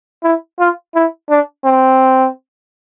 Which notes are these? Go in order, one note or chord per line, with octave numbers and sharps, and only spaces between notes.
E4
F4
E4
D4
C4